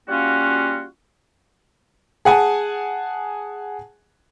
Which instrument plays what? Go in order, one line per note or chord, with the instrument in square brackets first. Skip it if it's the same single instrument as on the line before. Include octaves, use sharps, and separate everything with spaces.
[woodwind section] G3 A#3 C#4 F4 F#4
[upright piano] G#4 F#5 G#5 A5